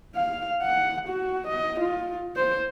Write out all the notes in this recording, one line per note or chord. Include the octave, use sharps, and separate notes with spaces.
F5
F#5
F#4
D#5
F4
C5